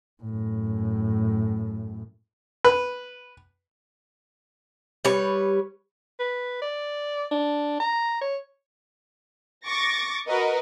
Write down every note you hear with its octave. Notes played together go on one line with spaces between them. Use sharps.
F#2 A2
B4
G3 B4 C#5
B4
D5
D4
A#5
C#5
C#6 D6 A6 A#6
F#4 A#4 B4 D#5